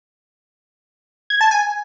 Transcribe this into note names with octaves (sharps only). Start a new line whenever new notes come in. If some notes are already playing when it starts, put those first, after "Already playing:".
G#6
A5
G#5